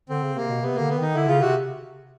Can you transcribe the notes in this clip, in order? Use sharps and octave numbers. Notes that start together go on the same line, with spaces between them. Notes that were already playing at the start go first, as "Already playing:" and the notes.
D3 C4
C#3
C3 A#3
B2
C3 B3
D3 A#3
B3
D#3 D#4
D3 E4
C#3 F4
C3 F#4